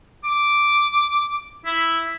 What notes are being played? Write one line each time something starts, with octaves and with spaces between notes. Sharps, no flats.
D6
E4